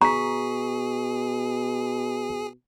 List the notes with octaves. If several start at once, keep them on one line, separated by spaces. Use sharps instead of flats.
B2 G#4 A#5 C#6 B6